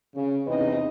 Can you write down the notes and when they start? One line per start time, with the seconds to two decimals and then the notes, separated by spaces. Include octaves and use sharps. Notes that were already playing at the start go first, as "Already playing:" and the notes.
0.15 C#3
0.46 E2 C3 C4 D#4 B4 D#5